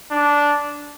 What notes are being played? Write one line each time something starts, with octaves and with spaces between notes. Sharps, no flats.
D4